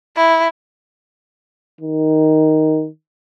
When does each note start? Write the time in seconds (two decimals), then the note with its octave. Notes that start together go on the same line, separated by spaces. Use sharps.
0.16 E4
1.81 D#3